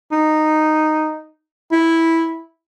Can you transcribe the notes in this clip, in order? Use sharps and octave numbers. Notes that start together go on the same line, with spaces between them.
D#4
E4